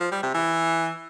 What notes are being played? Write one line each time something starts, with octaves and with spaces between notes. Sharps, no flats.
F3
G3
C3
E3